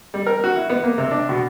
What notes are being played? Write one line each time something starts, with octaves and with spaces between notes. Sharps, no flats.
G3
A#4
F#4
E4
B3
A#3
C3
D4
B2